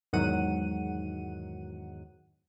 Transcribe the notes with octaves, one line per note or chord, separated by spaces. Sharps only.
E2 G#2 D#3 F#3 F#5 D#7